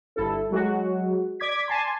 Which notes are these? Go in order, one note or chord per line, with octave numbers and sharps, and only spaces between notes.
G1 E4 A4
F#3 G#3 F#4
D5 D6 G#6 B6
G#5 A5 C6